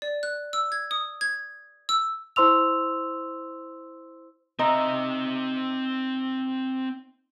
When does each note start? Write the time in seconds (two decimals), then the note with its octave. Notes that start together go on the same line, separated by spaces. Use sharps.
0.02 D5
0.23 F#6
0.53 E6
0.72 G#6
0.91 D#6
1.21 G#6
1.89 E6
2.36 E4 C5 C6 E6 F7
4.59 C4 D#4 E5